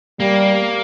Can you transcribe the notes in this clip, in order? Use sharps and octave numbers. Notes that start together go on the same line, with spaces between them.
G3 A#3